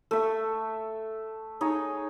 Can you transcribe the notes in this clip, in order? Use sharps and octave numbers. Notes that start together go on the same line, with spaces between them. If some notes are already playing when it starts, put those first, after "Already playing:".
A3 E5
D#4 G#4 C#5